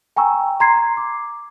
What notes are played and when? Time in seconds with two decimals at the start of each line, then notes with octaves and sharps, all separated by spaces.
0.16 G5 G#5 A#5 C#6 E6
0.60 A#5 C6 G#6 C7
0.97 D6